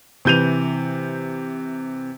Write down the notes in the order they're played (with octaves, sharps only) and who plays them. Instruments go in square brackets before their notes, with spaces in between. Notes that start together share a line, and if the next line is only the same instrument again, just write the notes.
[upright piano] C3 E3 G6 D#7 F7